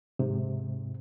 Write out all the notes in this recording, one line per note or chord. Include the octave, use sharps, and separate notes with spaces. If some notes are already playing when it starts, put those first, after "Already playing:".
G#2 C3